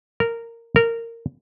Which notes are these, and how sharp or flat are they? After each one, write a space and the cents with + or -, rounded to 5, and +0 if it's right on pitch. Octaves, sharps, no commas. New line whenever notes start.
A#4 -10
A#4 -15